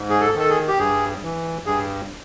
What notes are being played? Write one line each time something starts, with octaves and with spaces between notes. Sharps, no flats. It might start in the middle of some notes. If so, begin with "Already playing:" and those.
Already playing: G#2
G#4
A4
D#3 A4
G#4
G4
G2 G#4
E3
G2 G#4